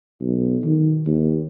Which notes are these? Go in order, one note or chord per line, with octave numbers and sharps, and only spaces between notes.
B1
D#3
D#2